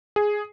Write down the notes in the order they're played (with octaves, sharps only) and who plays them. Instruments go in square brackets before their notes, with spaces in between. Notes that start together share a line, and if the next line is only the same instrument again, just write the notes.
[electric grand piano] G#4